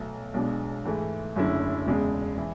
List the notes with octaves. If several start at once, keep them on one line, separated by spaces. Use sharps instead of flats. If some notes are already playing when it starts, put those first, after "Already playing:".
Already playing: B1 B2 A3
B1 B2 G#3 D4
G#2 E3 A3
F#1 F#2 D3 A3 E4
E1 E2 C#3 G#3
E3